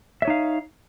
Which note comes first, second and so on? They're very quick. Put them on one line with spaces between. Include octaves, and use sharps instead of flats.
E5 C#5 D#4 F5